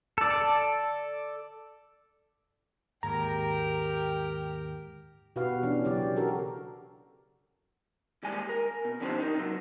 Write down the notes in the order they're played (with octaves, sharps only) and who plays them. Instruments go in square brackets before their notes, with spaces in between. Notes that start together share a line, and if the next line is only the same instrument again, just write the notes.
[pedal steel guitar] A4 D5
[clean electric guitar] D#2 G#2 G#3 [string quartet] G4 A#4 G5 [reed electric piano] A#5
[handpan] B2 F#4 G4 B4 F5
E3 C#4 D4
C#3 F#3 G4 D5
F#4 G4 A4 A#4
[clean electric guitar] D#2 G3 G#3 G#5
A#4
B2
D3 F3 C#4 D#4 G4 C5
D#4 A#4
C3 F#3